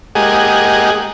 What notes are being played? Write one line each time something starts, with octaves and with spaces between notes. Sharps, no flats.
G#3 A#3 G4 G#4 D#5 F#5